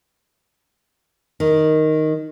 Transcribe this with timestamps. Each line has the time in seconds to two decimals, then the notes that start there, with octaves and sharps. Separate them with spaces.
1.40 D#3